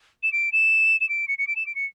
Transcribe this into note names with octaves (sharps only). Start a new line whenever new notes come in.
E7
D7
E7
E7
D7
C#7
C#7
D7
E7
D7
C#7